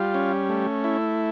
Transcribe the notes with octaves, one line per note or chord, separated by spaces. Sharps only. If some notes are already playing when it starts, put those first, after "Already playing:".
Already playing: G3 F4
C#4
A3
E4